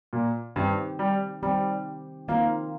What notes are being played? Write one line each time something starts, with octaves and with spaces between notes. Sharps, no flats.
A#2
G2 D#3 C4 G4
G3
D#3 G3 C4 G4
D#3 A#3 C4 F4 A#4